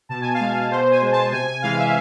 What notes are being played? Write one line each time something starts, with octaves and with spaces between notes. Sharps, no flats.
B2 A5
G#5
F5
G#3
G#5
B2 C5
G#5
G#3
A5
C3 G#5
G#5
E3 G#3 F5
E5